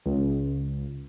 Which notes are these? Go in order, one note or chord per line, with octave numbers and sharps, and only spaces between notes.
C#2